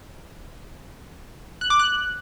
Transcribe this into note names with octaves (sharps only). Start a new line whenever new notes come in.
F#6
D6
F#6